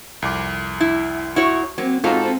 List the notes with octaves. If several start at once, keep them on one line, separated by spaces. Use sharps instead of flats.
C2 F2 D6
E4
E4 F#4 C#5
F#3 A#3 C4
G#2 C4 F4 F#4 A4 A#5